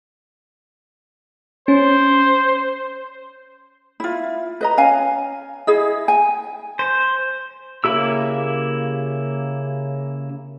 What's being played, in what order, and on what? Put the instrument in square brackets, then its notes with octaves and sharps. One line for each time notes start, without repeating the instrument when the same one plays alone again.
[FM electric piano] C#4 [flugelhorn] C5
[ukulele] E4 F4
B4 D#5 A#5
C#4 F5 G#5
E4 G#4 D#5
G#5
[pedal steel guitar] C5
C#3 A#3 E4 G4 E6